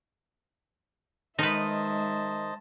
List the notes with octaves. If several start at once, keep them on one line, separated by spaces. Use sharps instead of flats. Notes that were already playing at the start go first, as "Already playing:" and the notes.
D#3 G#3 D#4 B4 C5 D#5 E5 A5